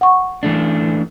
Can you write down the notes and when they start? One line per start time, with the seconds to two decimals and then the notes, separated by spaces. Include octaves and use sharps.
0.01 F#5 C#6
0.43 E3 A3 D4